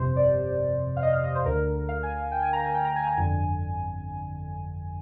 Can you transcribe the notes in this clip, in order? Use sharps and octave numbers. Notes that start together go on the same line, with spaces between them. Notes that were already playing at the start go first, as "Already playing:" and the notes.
Already playing: G1 F2 C3 C5
D5
F5
D#5
F5
D#5
C5
D2 D3 A#4
F5
G#5
G5
G#5
A#5
G#5
G5
A#5
G#5
A#5
G1 F2 D3 G#5